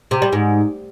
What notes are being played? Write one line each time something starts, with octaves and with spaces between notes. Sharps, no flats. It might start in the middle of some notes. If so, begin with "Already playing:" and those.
C3
G3
G#2